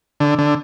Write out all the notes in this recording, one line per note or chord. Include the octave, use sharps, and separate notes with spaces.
D3
D3